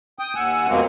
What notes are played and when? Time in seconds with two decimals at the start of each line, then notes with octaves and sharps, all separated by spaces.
0.19 G5 D#6
0.35 D#2 F#5 G#5 E6
0.68 F2 B2 F#3 G#3 A#3 C4